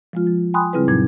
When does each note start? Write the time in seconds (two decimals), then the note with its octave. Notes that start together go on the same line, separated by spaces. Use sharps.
0.13 F3 G#3 F4
0.27 F3
0.54 G5 G#5 B5 C6 D#6 F#6
0.73 C#3 G3 C4 E4 G#4 B4
0.88 F#2 A#2 F#3 D#4 G#6